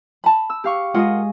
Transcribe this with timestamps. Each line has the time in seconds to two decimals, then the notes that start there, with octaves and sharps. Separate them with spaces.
0.24 A5 B5
0.50 E6
0.64 G4 F5 C#6
0.94 G#3 F4 A#4 D#5 F#5